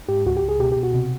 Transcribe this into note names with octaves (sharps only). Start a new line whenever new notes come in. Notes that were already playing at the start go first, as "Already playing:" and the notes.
G#2 G4
C#2 F#4
G4
C#2
G#4
B2 G4
B2 G4
F#4
C3